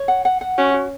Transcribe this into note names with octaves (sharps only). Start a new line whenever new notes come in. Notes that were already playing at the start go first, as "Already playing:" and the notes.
Already playing: C#5
F#5
F#5
F#5
C#4 F#4
F#4